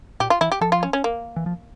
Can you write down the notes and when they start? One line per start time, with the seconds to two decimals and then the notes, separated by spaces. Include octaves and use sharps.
0.20 A#2 G4
0.30 F4
0.41 E3 E4
0.52 G4
0.61 F3 A4
0.72 F4
0.83 C#4
0.93 C#4
1.04 A#3
1.36 E3
1.46 F3